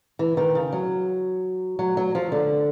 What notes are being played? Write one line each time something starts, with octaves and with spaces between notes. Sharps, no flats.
E3
D#3
C#3
F#3
F#3
F#3
F3
D3